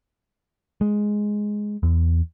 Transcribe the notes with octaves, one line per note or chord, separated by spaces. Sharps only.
G#3
E2